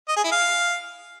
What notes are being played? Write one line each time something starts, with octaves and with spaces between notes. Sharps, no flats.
D#5
G#4
E4
F5